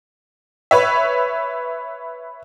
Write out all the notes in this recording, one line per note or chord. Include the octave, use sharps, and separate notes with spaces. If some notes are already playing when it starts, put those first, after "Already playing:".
B4 C#5 E5